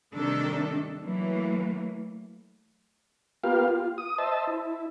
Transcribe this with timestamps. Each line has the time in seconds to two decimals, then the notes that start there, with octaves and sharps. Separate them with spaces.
0.15 C3 D#3 G3 A3 D4 A4
1.01 E3 F#3 A3 A#3
3.44 A#3 B3 F4 G4 F5
3.68 F4
3.98 D#6
4.18 C5 D#5 E5 A5
4.47 E4